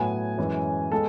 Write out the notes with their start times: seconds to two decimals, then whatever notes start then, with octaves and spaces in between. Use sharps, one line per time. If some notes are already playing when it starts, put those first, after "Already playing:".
Already playing: A2 F#3 B3 G#5
0.37 F#2 E3 G#3 C#4
0.91 G#3 B3 A4